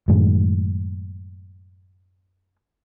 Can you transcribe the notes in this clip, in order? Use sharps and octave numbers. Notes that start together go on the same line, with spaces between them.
F#2 A2 D#3 G#3